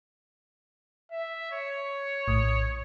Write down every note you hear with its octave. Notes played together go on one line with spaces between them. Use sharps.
E5
C#5
A#1 A2 D#6